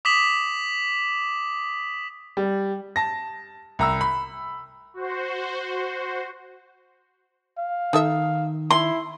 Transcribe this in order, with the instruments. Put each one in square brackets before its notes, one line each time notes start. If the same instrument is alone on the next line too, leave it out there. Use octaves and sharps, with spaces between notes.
[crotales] D6 D#6 B6 E7 F#7
[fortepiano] G3
[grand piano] A5 A#6
C2 A#5 E6
B5
[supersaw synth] F#4 C5
[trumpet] F5
[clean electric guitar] D#3 [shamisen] D#4 A4 E5
[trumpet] E4 [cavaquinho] C6